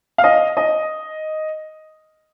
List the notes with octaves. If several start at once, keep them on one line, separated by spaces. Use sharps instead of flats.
F5
D#5
D#5